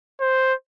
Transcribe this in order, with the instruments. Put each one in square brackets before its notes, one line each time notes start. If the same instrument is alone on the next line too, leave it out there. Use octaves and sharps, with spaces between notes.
[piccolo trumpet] C5